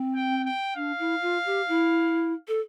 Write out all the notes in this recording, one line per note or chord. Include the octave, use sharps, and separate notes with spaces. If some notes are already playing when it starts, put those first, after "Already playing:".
Already playing: C4
G5
G5
D4 F5
E4
F4
G4
E4
A4